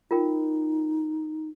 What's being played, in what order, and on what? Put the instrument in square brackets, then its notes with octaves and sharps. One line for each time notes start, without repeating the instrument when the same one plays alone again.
[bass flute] D#4 [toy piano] F4 A#4 G5